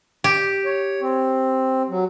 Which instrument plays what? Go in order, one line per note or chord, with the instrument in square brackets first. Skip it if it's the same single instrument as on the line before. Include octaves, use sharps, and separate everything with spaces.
[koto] G4
[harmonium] C#5
C4
F#3